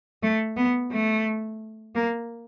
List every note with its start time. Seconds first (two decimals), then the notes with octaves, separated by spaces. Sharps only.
0.23 A3
0.57 B3
0.92 A3
1.95 A#3